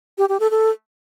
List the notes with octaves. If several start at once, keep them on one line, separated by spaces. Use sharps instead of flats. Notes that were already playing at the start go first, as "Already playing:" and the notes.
G4
G4
A4
A4